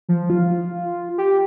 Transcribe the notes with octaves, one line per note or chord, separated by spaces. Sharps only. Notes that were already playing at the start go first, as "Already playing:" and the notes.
F3
F4
G4